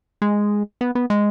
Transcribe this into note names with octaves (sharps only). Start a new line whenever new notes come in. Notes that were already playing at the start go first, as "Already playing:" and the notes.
G#3
B3
B3
G#3